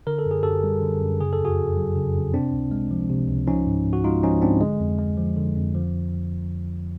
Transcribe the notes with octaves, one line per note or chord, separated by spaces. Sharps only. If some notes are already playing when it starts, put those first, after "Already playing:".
D3 A#4
A4
F#2
G#4
F#2 G4 A4
G3
D3
F#2
C#3 G#4
A4
F2
F#4 G#4
F2
F#3
C#3
F2
C3 C4 D4
C#2
G#3
F3
C3
C#2
F3 C#4 D#4
G#2
G#2
F#4
G#3 D#4 F4
F3 C#4 D#4
G#2 C4 D4
D3 G#3
F2
G#3
F3
D3
F2
F3